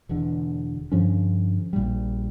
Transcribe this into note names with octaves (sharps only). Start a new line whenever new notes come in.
E1 E2 D3
G2 D3 F3 C#4
A#1 A#2 G3